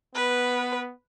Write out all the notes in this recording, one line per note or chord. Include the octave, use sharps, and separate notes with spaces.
B3 B4